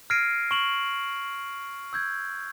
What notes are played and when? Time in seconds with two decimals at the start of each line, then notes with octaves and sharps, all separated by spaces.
0.10 F6 G#6 A#6 C7 D7 D#7
0.51 C#6 D7 E7 F#7
1.93 E6 G6 G#6